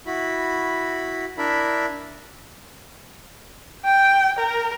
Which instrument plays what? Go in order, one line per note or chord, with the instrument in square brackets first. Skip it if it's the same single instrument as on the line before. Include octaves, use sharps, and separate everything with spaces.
[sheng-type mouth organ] E4 F#4 B5
D4 E4 A#4 E5 B5
[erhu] G5
A#4